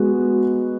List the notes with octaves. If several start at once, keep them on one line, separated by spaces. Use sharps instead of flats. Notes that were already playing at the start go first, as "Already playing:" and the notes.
Already playing: G#3 B3 F#4